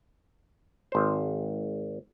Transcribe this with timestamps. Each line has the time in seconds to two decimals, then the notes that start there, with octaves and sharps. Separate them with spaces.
0.92 G#1 C5